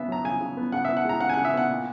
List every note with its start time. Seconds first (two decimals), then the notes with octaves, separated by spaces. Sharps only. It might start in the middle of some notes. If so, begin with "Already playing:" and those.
Already playing: C#3 B3 E5
0.09 F#3 A#5
0.24 C#3 G#5
0.41 C#3
0.57 B3
0.72 C#3 F#5
0.85 E5
0.89 B3
0.97 F#5
1.05 G#3 A#5
1.20 C#3 F#5
1.29 G#5
1.34 F#5
1.37 C#3
1.45 E5
1.54 B3 F#5
1.69 A#2